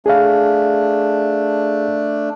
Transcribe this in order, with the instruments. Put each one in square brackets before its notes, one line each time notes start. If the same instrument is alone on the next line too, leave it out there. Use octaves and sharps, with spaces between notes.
[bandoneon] A3 D4 [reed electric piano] G#4 F5